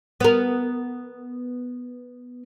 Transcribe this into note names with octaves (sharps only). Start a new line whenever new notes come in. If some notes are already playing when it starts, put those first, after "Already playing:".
B3 A#4